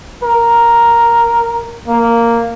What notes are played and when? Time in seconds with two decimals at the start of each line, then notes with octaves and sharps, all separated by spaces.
0.23 A#4
1.88 A#3